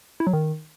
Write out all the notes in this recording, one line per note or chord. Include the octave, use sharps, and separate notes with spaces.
E4
F#3
D#3